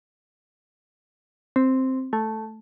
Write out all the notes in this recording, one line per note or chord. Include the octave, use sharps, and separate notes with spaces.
C4
A3